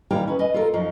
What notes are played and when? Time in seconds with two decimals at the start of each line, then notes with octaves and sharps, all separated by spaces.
0.11 D#2 E3 G3 F5 G5 A#5
0.27 C#4 B4
0.39 B4 D#5
0.54 F4 A4 A#4
0.74 F#2 F3 D#4